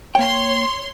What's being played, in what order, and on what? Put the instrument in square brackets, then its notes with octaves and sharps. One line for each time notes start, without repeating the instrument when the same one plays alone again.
[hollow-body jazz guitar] A#3 G5 [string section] C#5 C6